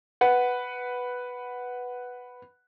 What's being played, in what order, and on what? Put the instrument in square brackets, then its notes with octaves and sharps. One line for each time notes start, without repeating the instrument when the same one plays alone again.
[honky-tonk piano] B4 F#5